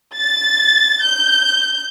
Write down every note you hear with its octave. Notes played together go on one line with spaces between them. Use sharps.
A6
G6